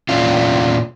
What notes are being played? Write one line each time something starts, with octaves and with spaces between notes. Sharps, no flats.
E2 A#2 C#4 D4 F4